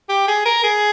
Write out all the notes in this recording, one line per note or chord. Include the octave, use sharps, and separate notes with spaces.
G4
G#4
A#4
G#4